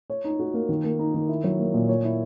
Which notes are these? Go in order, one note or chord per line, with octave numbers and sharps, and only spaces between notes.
C#5
D#4
F#4
A#3
D#3
A#3
D#4
D#3
E4
F#3
A#3
A#2
C#5
E4